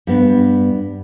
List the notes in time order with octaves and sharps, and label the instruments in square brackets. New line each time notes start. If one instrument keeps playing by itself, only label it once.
[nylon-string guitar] G2 B3